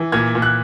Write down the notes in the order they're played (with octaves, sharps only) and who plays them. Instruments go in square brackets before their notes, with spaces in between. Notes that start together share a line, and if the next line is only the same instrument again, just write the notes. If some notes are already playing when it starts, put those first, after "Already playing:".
Already playing: [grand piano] E3
A#2 G#6
A#2
F#6